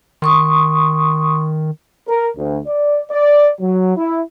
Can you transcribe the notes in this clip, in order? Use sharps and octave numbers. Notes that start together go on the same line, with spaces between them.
D#3 C6 C#6 D#6
A#4
D2
D5
D5
F#3
E4